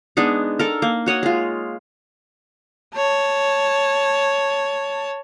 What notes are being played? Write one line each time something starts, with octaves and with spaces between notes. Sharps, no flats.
G#3 B3 D4 D#4
A4 A#4
A#3
F#4 C#5 D#5 F#5
G#3 F4
C#5 A5